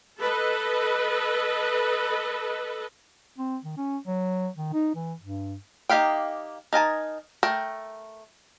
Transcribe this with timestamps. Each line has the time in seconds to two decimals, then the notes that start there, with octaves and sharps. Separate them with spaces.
0.18 A4 B4 D#5
3.38 C4
3.64 D#3
3.77 C#4
4.07 F#3
4.57 D#3
4.73 D#4
4.95 E3
5.20 G2
5.89 A#3 D#4 G4 F5 G5
6.73 D#4 A#4 G#5 A5
7.43 A3 A#4 G5